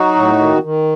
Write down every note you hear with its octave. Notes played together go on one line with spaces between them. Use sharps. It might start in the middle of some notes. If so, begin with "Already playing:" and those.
Already playing: F#3 D#4 F#4
A2
D#3
D#3